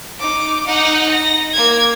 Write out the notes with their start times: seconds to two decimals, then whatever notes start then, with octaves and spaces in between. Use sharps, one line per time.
0.19 D#4 D6
0.65 D#4 F#5
1.11 A#6
1.53 A#3 G#6